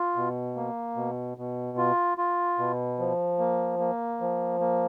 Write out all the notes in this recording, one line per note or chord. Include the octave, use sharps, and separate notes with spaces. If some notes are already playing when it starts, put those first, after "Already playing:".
Already playing: F4
B2
A#3
B2
B2
F4
F4
B2
F3
A#3
A#3
F3
A#3